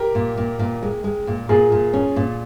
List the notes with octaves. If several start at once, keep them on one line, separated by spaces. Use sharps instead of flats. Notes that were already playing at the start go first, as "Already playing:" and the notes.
Already playing: G4 A#4
A#2
A#2
A#2
G#3
G#3
A#2
A#2 F4 G#4
A#2
C#4
A#2